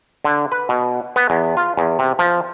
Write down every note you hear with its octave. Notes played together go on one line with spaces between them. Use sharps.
D3
B4
B2
B3
E2
F4
E2
C3
F3